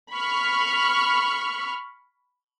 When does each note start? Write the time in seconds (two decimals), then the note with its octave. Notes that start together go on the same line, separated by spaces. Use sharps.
0.11 B5 C#6 F6